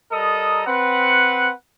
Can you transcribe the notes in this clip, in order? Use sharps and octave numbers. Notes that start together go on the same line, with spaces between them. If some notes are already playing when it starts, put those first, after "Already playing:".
G3 A4 A#4 D#5 A#5 D#6
C4 B4 F#5